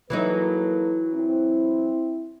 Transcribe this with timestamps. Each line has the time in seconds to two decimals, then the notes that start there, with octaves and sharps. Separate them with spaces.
0.10 E3 F#3 A#3 D#4 A4 B4
1.14 C4 E4